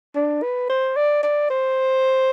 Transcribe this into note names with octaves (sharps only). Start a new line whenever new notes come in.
D4
B4
C5
D5
D5
C5